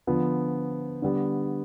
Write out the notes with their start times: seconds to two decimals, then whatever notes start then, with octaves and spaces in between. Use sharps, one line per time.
0.07 D3 F3 B3
1.02 D3 G3 B3